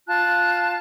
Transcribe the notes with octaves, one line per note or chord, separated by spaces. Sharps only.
F4 A5 F#6